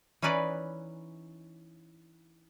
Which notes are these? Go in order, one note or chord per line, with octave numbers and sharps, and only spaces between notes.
E3 C#4 D#4 B4 D5